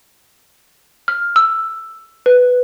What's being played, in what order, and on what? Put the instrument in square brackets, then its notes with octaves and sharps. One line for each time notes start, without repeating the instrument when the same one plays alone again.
[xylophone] F6
E6
B4